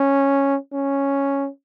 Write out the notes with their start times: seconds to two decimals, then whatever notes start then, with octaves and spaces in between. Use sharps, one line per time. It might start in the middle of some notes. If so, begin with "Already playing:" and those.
Already playing: C#4
0.73 C#4